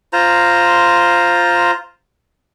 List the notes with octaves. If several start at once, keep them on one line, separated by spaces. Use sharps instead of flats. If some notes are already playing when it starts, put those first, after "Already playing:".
F4 C5 A#5